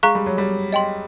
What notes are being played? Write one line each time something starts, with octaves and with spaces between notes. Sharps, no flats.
G#3 F5 A#5 C#6 F#6
G3
F#3
G3
D#5 G5 C6